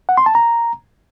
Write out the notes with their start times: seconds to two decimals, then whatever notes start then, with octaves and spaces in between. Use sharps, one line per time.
0.09 F#5
0.17 C6
0.26 A5
0.35 A#5